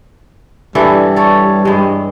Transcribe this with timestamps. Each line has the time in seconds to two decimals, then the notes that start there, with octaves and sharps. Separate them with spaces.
0.75 G2 E3 G3 A4
1.16 A4 C#5
1.65 G2 G#3